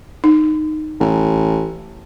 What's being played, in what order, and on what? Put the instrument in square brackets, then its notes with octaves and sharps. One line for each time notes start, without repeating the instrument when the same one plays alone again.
[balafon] D#4
[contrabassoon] A1